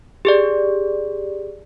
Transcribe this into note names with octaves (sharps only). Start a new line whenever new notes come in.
G4 G#4 D5